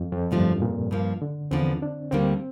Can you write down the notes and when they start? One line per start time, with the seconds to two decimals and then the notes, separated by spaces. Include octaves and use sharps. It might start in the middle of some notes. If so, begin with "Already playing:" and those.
Already playing: F2
0.12 F2
0.31 D2 G2 D3 F3 A3
0.62 A#2
0.91 G2 F3 A#3
1.22 D3
1.51 E2 D3 F3 C4
1.82 D4
2.11 D2 D3 G3 A#3 C4